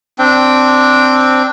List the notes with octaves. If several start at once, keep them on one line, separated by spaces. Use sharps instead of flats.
C4 D4 G5